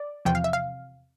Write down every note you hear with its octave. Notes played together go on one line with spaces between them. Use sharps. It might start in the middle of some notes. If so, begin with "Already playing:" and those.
Already playing: D5
E2 C3 F3 G5
F5
E5
F5